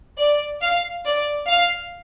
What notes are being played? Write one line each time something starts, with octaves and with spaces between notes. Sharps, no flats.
D5
F5
D5
F5